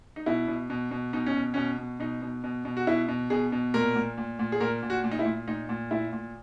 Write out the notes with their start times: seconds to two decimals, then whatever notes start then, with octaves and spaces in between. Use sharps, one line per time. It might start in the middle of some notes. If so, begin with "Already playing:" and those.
0.16 D#4
0.26 B2 E4
0.48 B2
0.70 B2
0.91 B2
1.13 B2 D#4
1.26 C#4
1.35 B2
1.54 B2 C#4
1.78 B2
2.00 B2 D#4
2.22 B2
2.44 B2
2.65 B2
2.77 F#4
2.87 B2 E4
3.08 B2
3.30 B2 G#4
3.52 B2
3.74 A#2 A#4
3.96 A#2
4.18 A#2
4.39 A#2
4.52 G#4
4.60 A#2 A#4
4.83 A#2
4.90 F#4
5.04 A#2
5.11 D#4
5.19 E4
5.25 A#2
5.48 A#2 D#4
5.69 A#2
5.91 A#2 E4
6.13 A#2